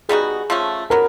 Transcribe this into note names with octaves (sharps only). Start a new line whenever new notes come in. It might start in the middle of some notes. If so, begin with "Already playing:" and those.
G3 B3 D#4 F#4 G#4
F3 A3 C#4
F#3 B3 A#4